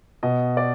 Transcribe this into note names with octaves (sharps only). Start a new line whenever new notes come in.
B2 D#5
D5